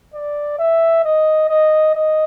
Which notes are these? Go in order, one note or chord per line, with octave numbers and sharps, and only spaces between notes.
D5
E5
D#5
D#5
D#5